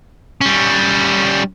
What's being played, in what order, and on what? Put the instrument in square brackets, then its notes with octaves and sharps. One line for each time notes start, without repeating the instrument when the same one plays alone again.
[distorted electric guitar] G3 C#4